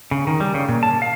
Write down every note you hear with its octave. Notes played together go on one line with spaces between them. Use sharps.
C#3
D#3
G3
C#3
A#2
A5
F5